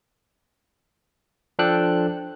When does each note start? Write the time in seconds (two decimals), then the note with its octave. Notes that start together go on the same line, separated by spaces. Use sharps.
1.59 F3 D4 A4 G5 F#6